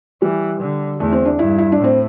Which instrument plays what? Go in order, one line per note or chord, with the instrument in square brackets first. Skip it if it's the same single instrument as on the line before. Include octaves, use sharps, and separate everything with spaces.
[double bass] E3 [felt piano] G3
[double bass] D3
[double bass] E2 [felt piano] A3
[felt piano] C4
D4
[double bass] G2 [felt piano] E4
[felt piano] E4
D4
[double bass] A2
[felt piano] C4